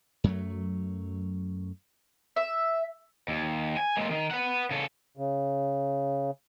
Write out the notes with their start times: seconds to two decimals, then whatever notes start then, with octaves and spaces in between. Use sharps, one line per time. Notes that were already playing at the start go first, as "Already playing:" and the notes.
0.24 F#2 F#3 A3
2.36 E5
3.28 D#2
3.77 G#5
3.97 G#3 A#3
4.11 D#3
4.31 B4 F#5
4.71 C#3 A4
5.17 C#3